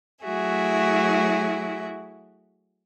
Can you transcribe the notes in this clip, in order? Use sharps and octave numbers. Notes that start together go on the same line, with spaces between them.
F#3 A3 E4 F#4 G#4 E5